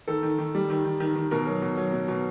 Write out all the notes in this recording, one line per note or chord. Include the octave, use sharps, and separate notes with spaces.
D#3 A4
D#3
D#3
G3
D#3
D#3
D#3
D#3
B2 A#4
F#3
B2
F#3
B2
B2